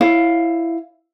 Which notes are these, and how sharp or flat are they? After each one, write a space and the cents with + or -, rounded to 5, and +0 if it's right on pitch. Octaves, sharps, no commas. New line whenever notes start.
E4 +10 C#5 +0 F5 +5